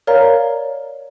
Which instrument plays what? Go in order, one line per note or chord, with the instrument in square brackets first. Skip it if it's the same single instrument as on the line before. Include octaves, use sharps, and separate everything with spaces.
[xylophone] A#4 C#5 D5 F5 A#5